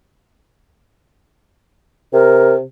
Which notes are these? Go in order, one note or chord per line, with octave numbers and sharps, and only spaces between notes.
C3 A#4